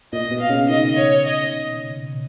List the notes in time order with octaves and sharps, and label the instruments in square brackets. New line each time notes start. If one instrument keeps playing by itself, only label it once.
[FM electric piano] A#2 [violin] D#5
[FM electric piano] B2
[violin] F5
[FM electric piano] C#3
[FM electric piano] D#3 [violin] D#5
[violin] C#5
D#5